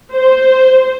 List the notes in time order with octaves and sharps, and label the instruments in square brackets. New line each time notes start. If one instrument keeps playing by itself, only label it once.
[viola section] C5